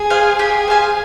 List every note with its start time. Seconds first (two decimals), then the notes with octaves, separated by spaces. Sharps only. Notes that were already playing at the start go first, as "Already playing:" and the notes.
Already playing: G#4
0.10 C5 F5 G#5
0.39 G4 G#4
0.68 C5 F5 G#5